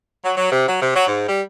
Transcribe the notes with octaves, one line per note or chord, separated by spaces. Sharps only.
F#3
F#3
C3
F#3
C3
F#3
G#2
G3